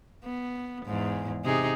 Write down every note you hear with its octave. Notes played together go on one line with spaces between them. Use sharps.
B3
E2 G#2
C3 D#4 G#4